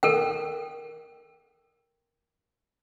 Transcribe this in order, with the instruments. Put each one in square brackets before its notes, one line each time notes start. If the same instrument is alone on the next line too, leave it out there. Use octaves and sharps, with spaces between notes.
[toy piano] A4 A#4 G5